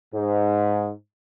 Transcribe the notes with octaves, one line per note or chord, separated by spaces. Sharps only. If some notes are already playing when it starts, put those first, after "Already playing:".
G#2